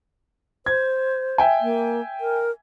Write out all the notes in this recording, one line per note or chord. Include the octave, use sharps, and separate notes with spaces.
C5 G#6
E5 G5 G#5
A#3
A#4